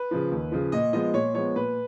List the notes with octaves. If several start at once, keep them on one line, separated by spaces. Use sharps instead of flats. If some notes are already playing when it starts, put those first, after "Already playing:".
Already playing: B4
C#3 F3
D#2
C#3 F3
A#2 D#5
F3 G#3 B3 D#5
A#2 C#5
F3 G#3 B3 C#5
A#2 B4